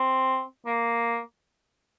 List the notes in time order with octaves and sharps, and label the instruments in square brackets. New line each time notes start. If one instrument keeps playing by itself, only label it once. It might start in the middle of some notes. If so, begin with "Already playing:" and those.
Already playing: [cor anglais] C4
A#3